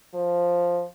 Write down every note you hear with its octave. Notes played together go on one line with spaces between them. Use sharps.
F3